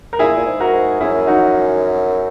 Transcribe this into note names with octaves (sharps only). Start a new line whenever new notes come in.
A#4
A#2 E4 G#4
A#2
G#2
F#4 A#4
G#2
F#2 E4 G#4
D#4 F#4